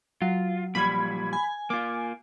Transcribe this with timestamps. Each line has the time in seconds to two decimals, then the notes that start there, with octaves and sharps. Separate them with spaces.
0.22 F#3 F4
0.75 A#2 F3 G3 B5 G#6
1.33 G#5
1.70 A#3 F4 D6